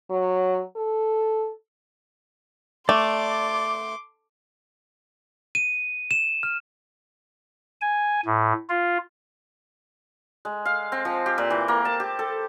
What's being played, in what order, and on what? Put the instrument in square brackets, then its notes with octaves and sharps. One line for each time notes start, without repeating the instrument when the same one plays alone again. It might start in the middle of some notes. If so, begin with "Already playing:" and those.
[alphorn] F#3
A4
[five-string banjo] A3 [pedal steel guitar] D5 [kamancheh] C6 D6
[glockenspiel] D#7
E7
F6
[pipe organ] G#5
A2
F4
[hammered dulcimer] G#3
F5
C4
F3
G4
A#2
E3
A#3
A5
G4
A4